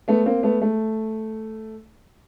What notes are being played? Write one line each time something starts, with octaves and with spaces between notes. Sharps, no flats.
A3 B3
A#3 C4
A3 B3
A3